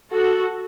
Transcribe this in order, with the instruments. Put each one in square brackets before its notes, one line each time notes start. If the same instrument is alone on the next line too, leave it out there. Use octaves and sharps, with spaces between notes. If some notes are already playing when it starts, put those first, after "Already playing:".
[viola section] F#4 A4